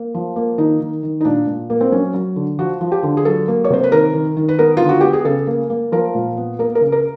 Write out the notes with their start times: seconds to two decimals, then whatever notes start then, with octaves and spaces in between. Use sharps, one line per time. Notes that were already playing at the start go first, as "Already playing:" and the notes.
Already playing: A#3
0.14 F3
0.36 A#3
0.58 D#3 D#4
0.80 D#3
1.03 D#3
1.21 D#4
1.25 A#2 D4
1.47 A#2
1.70 A#3
1.81 C4
1.92 F#3 C#4
2.14 F#3
2.36 D3
2.59 F3 F#4
2.81 F3
2.92 G4
3.03 D3
3.17 G#4
3.25 F#3 A4
3.48 A#3
3.64 C#5
3.70 C3 C5
3.83 B4
3.92 D#3 A#4
4.14 D#3
4.37 D#3
4.48 B4
4.59 B3 A#4
4.77 D3 F4
4.89 F#4
5.01 B3 G4
5.13 G#4
5.25 C#3 A4
5.47 A#3
5.70 A#3
5.92 F3 A#4
6.15 A#2
6.37 B3
6.59 A#3 A#4
6.75 A#4
6.81 C#3
6.92 A#4